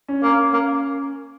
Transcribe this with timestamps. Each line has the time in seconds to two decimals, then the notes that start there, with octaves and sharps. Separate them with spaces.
0.08 C#4
0.23 A#3 C#4
0.53 A#3